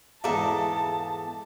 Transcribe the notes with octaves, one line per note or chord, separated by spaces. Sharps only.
E2 G#2 G#4 A4 F5 A5 A#5 D6